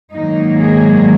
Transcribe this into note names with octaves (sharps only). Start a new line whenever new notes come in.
G#2 D#3 F#3 A#3 D#4
G#4